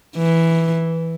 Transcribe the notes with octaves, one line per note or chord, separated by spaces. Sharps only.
E3